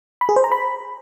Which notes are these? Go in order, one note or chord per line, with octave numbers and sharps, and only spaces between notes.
B5
G#4
C5
A#5
B5